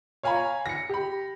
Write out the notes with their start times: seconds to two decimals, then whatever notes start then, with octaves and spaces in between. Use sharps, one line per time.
0.23 C#5 F5 G#5 A#5 B5 C#6
0.66 A#6 C#7
0.89 G4 B5